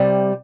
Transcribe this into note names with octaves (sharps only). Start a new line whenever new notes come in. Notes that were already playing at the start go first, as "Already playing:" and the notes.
Already playing: C3 G3